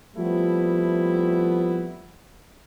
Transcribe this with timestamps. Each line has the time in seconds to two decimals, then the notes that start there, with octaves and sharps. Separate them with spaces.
0.16 F3 G3 A3 B3 C4 E4